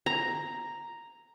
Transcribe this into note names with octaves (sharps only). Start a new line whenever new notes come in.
A#5